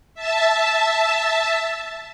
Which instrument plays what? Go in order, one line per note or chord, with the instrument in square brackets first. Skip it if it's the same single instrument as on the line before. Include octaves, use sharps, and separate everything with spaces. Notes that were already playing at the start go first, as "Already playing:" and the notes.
[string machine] E5 A5